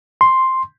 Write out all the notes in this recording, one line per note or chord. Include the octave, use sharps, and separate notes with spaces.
C6